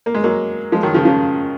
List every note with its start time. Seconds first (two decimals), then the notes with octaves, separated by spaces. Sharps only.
0.06 A#3
0.14 G#3
0.24 F#3 A#3
0.72 F3 G#3
0.83 D#3 F#3
0.94 C#3 F3
1.05 C#3 F3